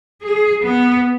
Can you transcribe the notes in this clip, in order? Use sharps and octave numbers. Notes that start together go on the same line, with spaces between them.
G#4
B3